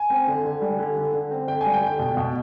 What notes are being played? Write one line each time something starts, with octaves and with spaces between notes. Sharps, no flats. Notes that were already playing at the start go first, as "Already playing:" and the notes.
Already playing: G#5
C4
D3
D3
G3
D3
D3
D3
C4
D3 G5
G#5
G3
G5
D3
G5
B2
B2